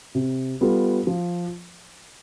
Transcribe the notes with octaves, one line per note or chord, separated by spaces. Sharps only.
C3
G3 B3 F4 A4
F3